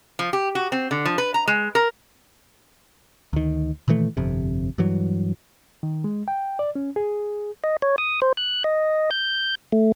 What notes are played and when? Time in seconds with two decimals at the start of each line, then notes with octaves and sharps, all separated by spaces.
0.19 F3
0.33 G4
0.55 F#4
0.72 C4
0.91 D3
1.05 F3
1.18 B4
1.34 A#5
1.47 G#3
1.75 A#4
3.33 D2 D#3
3.88 A#2 D#3 E3 A3
4.17 G1 F2 C3
4.78 G2 E3 F#3
5.83 D#3
6.04 G#3
6.28 G5
6.59 D5
6.76 C#4
6.96 G#4
7.64 D#5
7.82 C#5
7.98 D#6
8.22 C5
8.37 F#6
8.64 D#5
9.11 G6
9.72 A3